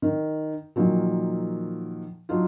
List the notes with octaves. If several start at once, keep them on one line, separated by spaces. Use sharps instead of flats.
D#3
A#2 D#3 F3 F#3
F#3 D4 D#4 F4